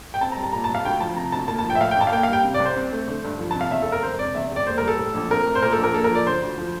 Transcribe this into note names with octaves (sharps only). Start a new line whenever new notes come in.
G5
C4 A5
A#5
G3
A5
A#2 A#5
A5
C2
F5
D2 G5
F3 A5
C3 A#5
D2 A5
A#3 A5
A5
F3
G5
E5
A2 F5
A1 G5
A5
F5
A#3 G5
F5
G3 G5
C3
D5
C2
C5
C4
A3
D3
G2
F3
A5
C3
F5
E2 E5
A4
F1 A#4
E1 C5
C3 D5
E2 E5
E1 D5
A#3 C5
A#4
G3
A4
A2
A#1
C4 A#4
A3
C5
A#2 A#4
A4
A#1
A#4
A#3 A4
A#4
F3 D5
D3 C5
D2
F3